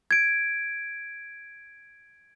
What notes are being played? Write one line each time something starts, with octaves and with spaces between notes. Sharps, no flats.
G#6 D7